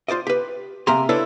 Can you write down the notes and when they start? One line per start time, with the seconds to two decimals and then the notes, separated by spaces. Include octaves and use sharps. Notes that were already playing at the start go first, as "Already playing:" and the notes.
0.08 F4 C5 D5 D#5
0.27 G4 B4
0.87 C3 A#3 G4 G#5 A#5 C6
1.09 D4 E4 A4 B4 C#5 D5